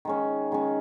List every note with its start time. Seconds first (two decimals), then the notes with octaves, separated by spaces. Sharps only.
0.05 D#3 G#3 C#4
0.52 D#3 G#3 C#4